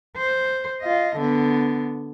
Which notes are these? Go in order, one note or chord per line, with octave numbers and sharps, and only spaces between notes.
C5
F4 D#5
D3 B3